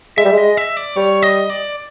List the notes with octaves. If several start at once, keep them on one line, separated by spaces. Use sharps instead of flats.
G#3 E5
G3
G#3 D#5
E5
D5
G3 C#5
D#5
D5